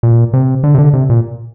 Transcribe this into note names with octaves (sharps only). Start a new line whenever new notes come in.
A#2
C3
D3
C3
D3
C3
A#2